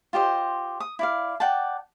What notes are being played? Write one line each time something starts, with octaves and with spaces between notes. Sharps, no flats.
F4 G4 C5 D#5
D#6
E4 D5 F5
D5 F#5 G5 A5